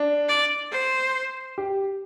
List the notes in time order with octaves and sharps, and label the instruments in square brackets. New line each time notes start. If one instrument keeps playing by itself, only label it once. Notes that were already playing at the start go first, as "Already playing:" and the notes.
Already playing: [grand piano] D4
[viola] D5
C5
[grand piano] G4